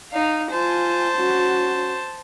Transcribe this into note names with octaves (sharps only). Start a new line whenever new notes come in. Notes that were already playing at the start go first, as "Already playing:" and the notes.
D#4 F5
F4 C5 G#5 A5
C#4 F#4